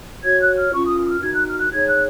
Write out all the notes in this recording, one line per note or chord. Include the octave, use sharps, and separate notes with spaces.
F#4 C#5 G#6
F#6
F6
C#4 F4 A#4 C#6
D#6
D#6
F6
D#4 F#4 A#4 G#6
F#6
F6
F#6
D#4 G#4 C#5 G#6
F#6